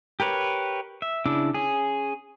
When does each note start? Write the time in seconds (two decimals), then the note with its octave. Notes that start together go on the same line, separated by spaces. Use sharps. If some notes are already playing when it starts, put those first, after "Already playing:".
0.20 G4 A#4 B4 C#5
1.02 E5
1.26 C#3 D4 E4 D6 E6
1.54 C#4 G#4